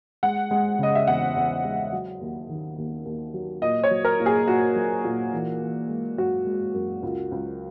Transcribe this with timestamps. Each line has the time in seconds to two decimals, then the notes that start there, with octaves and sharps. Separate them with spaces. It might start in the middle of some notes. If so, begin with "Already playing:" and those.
0.23 G#3 F#5
0.51 G#3
0.79 C#3 D#5
0.95 E5
1.07 E2 F#5
1.36 E2
1.64 G#3
1.92 F#3
2.21 D#2
2.49 D#3
2.78 D#2
3.05 D#2
3.34 F#3
3.62 A#2 D#5
3.84 C#5
3.91 F#3
4.05 A#4
4.20 A#2
4.26 G#4
4.47 A#2 F#4
4.76 F#3
5.05 A#2
5.33 E3
5.62 E3
5.89 G#3
6.18 F#2 F#4
6.46 G#3
6.74 F#2
7.03 C#2
7.31 C#2